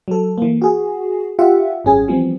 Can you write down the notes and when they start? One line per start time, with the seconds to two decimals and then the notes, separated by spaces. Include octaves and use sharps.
0.08 F#3 A4
0.38 E3 A#3
0.62 F#4 G#4
1.39 F4 G4 E5 F#5
1.85 G#1 F#2 C#4 G#4 G#5
2.08 E3 F3 G3 B3 C4